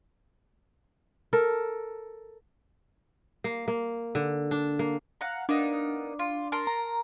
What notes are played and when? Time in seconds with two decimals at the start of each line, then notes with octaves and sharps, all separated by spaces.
1.33 A4 A#4
3.44 A#3
3.68 A#3
4.15 D3
4.51 D4
4.79 A#3
5.21 F5 F#5 A#5
5.49 A#3 B3 D4 D#4
6.19 F4
6.52 A#4 A5 C6
6.67 A#5